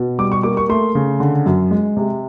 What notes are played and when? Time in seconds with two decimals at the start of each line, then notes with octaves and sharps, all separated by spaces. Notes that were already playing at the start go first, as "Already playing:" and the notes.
Already playing: B2
0.19 G3 D6
0.32 C#6
0.43 A#3 D6
0.57 C#6
0.69 A3 C6
0.95 C#3
1.20 D3
1.46 F#2
1.71 G#3
1.97 C3